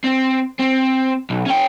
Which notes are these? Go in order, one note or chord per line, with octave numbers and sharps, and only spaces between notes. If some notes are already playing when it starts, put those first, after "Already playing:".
C4
C4
B1
C#4 G5